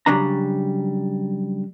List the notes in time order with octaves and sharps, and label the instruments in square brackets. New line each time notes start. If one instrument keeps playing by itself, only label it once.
[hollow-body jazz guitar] C#3 F#3 G3 D4 A#5